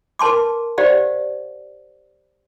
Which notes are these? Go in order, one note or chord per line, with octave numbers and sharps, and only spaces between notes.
A#4 B4 A5 C6 D6
G4 C5 D5 F5 F#5